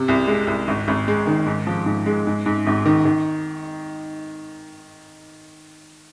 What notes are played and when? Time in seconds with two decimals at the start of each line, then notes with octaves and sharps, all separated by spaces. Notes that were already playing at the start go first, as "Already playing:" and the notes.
Already playing: C3
0.08 C2
0.28 G#3
0.47 C2
0.68 G#1
0.88 G#1
1.08 G#3
1.27 D#3
1.46 G#2
1.67 F3
1.86 G#2
2.06 G#3
2.27 G#2
2.46 G#2
2.67 G#1
2.86 D#3
3.05 D#3